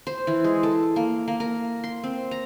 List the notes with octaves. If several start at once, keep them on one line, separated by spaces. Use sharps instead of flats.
C5
E3
G#3
A4
A#3
A#3
A#4
C6
C4
A#5